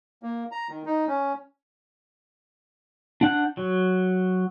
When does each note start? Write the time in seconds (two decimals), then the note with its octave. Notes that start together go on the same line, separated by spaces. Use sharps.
0.23 A#3
0.51 A#5
0.69 D#3
0.85 D#4
1.07 C#4
3.21 D4 F#5 F#6 G6
3.57 F#3